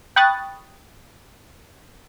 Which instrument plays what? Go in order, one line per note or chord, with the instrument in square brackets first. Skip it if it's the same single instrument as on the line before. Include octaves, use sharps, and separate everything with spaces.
[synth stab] G5 B5 C#6 D#6 F#6 A6